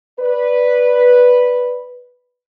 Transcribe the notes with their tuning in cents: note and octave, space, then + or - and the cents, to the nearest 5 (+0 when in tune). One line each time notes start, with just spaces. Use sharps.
B4 -5 D5 +0